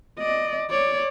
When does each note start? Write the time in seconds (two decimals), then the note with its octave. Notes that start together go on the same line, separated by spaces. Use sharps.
0.19 D5 D#5
0.71 C#5 D5